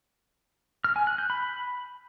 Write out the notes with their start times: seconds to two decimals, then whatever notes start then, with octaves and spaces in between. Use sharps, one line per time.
0.84 F6
0.96 G#5
1.07 F#6
1.18 G6
1.30 B5